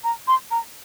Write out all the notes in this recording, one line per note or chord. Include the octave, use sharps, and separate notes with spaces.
A#5
C6
A#5